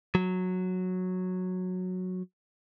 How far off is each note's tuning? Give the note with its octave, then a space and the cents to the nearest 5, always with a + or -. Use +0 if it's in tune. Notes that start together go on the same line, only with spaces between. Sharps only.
F#3 -10